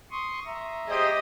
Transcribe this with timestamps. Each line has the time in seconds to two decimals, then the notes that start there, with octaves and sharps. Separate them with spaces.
0.11 C6 C#6 D#6
0.46 E5 A#5
0.88 G4 G#4 C5 D#5